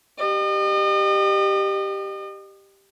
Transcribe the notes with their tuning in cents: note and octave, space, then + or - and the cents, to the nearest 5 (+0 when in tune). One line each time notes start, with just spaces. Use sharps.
G4 +0 D#5 -40